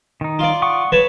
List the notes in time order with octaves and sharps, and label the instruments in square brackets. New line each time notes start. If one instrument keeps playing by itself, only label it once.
[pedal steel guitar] D#3 D#4
[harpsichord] F4 D5
[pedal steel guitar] F#5 C#6 D#6
[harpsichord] B4 C#5 A5